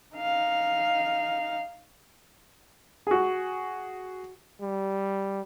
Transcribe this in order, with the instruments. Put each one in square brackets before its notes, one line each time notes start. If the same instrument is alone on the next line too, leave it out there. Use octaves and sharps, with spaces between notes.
[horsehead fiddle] D#4 F5
[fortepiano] F#4 G#4
[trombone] G3